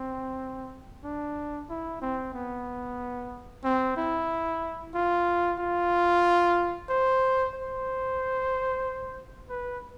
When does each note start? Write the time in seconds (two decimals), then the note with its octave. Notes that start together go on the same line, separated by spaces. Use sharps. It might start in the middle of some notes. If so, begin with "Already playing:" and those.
Already playing: C4
1.04 D4
1.69 E4
2.02 C4
2.34 B3
3.64 C4
3.97 E4
4.94 F4
5.59 F4
6.89 C5
7.55 C5
9.49 B4